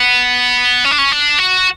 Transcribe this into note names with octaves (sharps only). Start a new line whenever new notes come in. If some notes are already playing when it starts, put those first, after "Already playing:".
Already playing: B3
C#4
D4
C#4
D4
F#4